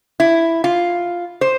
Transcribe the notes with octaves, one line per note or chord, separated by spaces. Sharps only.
E4
F4
C5